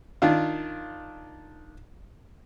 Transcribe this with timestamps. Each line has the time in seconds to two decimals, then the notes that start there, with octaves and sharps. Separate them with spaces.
0.22 D#3 D4 F4